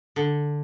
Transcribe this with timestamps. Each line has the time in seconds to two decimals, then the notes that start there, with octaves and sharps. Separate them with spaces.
0.16 D3